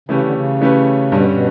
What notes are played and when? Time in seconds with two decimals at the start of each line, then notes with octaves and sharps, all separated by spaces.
0.09 C#3 E3 A3 C#4 G4 B4
0.21 D3
0.33 C#3
0.61 E3 A3 C#4 G4 B4
1.11 G2 B2 D3 G3 C#4
1.29 B2